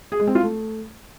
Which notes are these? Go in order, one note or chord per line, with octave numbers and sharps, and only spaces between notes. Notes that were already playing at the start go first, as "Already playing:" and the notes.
G#4
G#3
C4
F4
A3